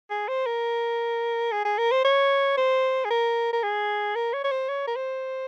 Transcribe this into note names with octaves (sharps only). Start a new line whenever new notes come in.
G#4
C5
A#4
G#4
G#4
A#4
C5
C#5
C5
G#4
A#4
A#4
G#4
A#4
C#5
C#5
C5
C#5
A#4
C5